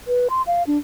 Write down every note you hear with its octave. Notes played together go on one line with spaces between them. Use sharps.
B4
C6
F5
D4